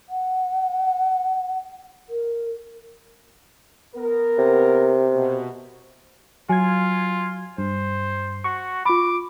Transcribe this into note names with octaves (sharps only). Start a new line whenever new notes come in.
F#5
A#4
B3 A#4
C3
B2
F#3 F4 G#5 G#6
G2 C5
F#4 C#6
F4 B5 D6